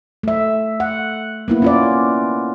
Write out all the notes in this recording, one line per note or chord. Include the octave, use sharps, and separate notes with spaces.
A3 E5
F#5
A#3 B3 E4
C#4 F4 D5